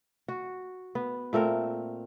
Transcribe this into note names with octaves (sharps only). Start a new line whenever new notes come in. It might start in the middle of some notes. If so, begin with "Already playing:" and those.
F#4
B3
A#2 A3 C4 A#4